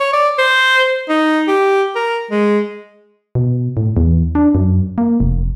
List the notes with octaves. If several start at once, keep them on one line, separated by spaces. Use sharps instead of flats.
C#5
D5
C5
D#4
G4
A#4
G#3
B2
A2
E2
D4
F#2
A#3
F1